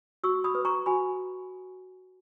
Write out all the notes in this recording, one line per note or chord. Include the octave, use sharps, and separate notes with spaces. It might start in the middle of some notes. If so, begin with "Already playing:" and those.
F#4 C#6 E6
B5 D#6
B4
A#5 C#6
F#4 G#5 B5